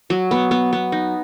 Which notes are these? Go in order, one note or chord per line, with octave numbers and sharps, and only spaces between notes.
F#3
B3
B3
B3
D#4